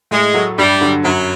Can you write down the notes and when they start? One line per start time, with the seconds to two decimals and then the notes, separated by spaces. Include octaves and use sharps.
0.11 A2 G#3
0.34 F#3 A3
0.58 G2 G3
0.81 D3 F#3
1.04 F#2 F#3